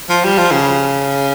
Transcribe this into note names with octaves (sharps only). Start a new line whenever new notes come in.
F3
G3
F3
C#3